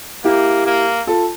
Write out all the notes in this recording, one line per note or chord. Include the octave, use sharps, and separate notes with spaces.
A#3 E4 G4
A#3
F4 A4